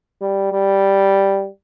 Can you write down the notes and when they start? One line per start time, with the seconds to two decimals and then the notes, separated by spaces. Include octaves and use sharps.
0.21 G3
0.52 G3